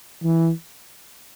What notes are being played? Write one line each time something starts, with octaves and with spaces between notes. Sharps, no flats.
E3